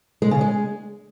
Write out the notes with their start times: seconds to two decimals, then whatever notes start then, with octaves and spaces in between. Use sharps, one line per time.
0.22 G#3
0.31 C#3
0.41 G#3